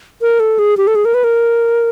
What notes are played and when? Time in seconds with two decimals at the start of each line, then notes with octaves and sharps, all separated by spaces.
0.22 A#4
0.40 A4
0.59 G#4
0.77 G4
0.87 A4
0.95 G#4
1.05 A#4
1.14 B4
1.24 A#4